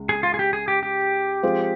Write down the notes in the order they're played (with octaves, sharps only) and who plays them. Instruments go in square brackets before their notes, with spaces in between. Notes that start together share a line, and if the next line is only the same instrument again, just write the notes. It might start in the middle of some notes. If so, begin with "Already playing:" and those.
Already playing: [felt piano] C#2 C#3 G#3
[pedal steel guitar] G#4
F4
G#4
G4
G#4
G4
G4
[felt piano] F3 G#3 C4 F4 C5